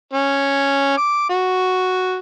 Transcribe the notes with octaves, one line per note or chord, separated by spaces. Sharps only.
C#4
D6
F#4